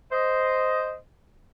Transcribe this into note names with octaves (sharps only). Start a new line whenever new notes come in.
C5 D#5